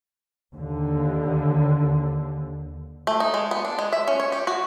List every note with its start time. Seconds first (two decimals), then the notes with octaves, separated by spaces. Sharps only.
0.53 D#2 D3
3.07 A3
3.20 D#4
3.34 G#3
3.51 B3
3.65 D4
3.79 G#3
3.93 E5
4.08 C#4
4.20 C#5
4.32 G4
4.47 F#4